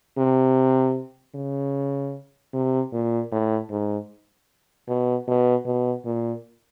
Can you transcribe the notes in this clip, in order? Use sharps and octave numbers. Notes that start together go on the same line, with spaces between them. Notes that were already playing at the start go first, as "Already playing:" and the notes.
C3
C#3
C3
A#2
A2
G#2
B2
B2
B2
A#2